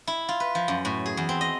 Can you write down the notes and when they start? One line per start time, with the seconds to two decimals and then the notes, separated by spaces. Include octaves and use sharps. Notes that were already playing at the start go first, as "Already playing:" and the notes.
0.07 E4
0.29 F4
0.40 B4
0.55 F3
0.68 F#2
0.85 A2
1.06 G#4
1.17 E2
1.29 C4
1.41 D#5